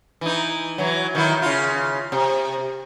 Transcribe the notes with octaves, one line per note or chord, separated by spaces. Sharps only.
E3 D#4
E3 F#3
D#3 F#3 E4
C#3 F4
C3